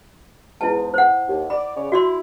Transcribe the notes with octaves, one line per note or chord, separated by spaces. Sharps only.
E2 G#2 E4 A5
C5 F#5
D#2
D5 B5
C#3 C#5 D5
E4 F#4 D5 C6